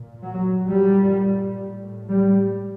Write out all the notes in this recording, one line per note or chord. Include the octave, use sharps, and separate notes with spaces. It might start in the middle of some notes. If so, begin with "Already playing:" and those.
Already playing: A#2
F#3
A#2 G3
A2
G3